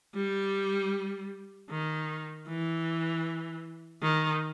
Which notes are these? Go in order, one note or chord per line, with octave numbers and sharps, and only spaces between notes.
G3
D#3
E3
D#3